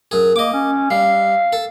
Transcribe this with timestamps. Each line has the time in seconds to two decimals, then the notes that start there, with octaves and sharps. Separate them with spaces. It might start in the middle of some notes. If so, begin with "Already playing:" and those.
0.11 F#2 G#4
0.36 A#3 D#5 D6
0.53 C#4
0.90 G3 F5
1.53 A4